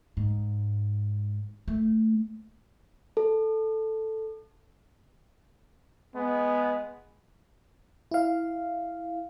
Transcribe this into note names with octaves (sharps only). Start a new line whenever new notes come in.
G#2
A3
A4
G#3 B3
E4 F5